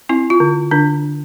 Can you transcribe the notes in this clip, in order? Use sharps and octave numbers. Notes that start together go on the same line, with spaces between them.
C4 E4
F4
D3
D3 D4